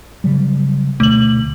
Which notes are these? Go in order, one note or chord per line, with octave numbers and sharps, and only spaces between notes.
C#3 F#3 G3
D2 B2 A3 F#7